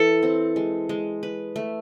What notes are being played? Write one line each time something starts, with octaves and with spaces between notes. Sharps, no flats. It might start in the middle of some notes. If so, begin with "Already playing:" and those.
Already playing: E3 A4
C4
G#3
G#3
B4
A3